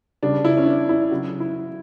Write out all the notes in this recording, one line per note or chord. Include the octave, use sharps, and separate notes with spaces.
C#3 G3 D4
E4
C#4
D4
E4
C#3 F#3 F#4
E4